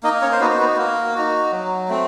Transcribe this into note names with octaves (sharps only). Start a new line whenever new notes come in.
A#3 D#4 D#5
C#4 C#5
C5
B3 D#4 F#4 B4
C5
B3 B4
A#3
D#4 F#4
F#3
A3 C4